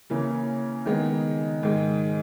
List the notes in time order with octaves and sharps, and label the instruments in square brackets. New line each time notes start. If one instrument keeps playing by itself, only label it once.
[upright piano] C#3 E3 A#3
D#3 G#3 B3 D#4
G#2 D#3 G#3